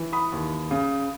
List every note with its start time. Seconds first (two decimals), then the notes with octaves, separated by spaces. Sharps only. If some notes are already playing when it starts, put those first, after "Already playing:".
Already playing: E3
0.12 B5 D#6
0.32 D#2
0.71 C#3